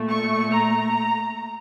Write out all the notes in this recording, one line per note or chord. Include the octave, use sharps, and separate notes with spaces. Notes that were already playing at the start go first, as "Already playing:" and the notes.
Already playing: A#2 A3
C#6
A#5